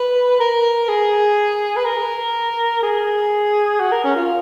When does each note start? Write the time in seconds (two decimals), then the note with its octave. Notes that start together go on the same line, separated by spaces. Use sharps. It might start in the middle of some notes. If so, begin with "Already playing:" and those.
Already playing: B4
0.40 A#4
0.88 G#4
1.76 B4
1.85 A#4
2.83 G#4
3.80 F#4
3.92 A#4
4.04 C#4
4.16 F4